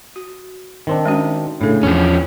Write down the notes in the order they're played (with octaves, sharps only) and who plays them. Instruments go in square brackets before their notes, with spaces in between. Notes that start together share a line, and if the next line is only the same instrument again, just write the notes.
[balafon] F#4
[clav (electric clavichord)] D#3 C4 D4
[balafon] G#3 C#4 F#4
[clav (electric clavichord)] A2 C#3 [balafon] D4 A4
[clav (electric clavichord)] E2 [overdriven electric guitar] F3 C#4